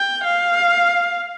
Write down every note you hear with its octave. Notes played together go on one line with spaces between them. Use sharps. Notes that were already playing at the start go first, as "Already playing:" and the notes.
Already playing: G5
F5